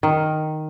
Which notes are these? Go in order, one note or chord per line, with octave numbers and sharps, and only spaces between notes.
D#3